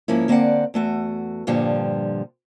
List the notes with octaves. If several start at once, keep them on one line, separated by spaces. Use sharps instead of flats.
G#2 F3 A#3 C#4 E4
D3 A#3 C4 D5 F#5
E2 A3 F#4
G2 A#2 D3 F3 G3